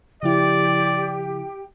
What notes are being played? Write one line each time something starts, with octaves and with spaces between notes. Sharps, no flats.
C#3 F3 E4 G4 D5 G5